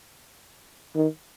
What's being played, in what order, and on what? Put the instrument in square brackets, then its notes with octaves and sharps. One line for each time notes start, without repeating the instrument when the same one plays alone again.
[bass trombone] D#3